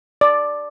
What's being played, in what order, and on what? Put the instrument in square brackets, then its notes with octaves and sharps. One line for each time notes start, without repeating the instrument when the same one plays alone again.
[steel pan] D5